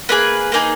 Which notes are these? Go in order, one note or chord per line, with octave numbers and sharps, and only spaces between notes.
A#3 D#4 G#4 B4
A#3 D#4 G#4